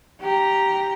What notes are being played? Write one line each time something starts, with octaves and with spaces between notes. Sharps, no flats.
G4 A#5